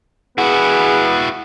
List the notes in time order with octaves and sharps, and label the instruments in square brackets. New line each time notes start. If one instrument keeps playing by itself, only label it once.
[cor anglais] B3 [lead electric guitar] E4 F#4 [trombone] G#4 [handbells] F#5